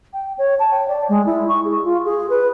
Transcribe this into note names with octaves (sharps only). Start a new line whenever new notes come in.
G5
C#5
A5
G5
D5
G#3
E4
C#6
G#4
F4
G#4
B4